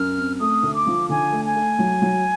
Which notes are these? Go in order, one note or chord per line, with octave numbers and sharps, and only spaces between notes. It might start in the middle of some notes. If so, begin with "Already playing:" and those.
Already playing: F#2 F6
C4
A3 D#6
D2
D6
F3
D3 G#5
A3
G#5
A3
F#3
F#3